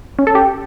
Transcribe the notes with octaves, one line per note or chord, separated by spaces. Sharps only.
C#4
A4
G4